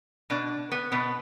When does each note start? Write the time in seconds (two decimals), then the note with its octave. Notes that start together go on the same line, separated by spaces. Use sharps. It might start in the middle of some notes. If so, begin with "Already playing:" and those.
0.30 B2 D4
0.72 B3
0.92 B2 B3